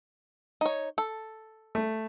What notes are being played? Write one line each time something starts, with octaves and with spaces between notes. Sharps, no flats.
D#4 C#5
A4
A3